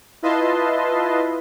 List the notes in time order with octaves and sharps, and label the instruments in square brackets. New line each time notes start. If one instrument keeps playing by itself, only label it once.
[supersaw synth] E4 F4 B4 D#5 A5 C6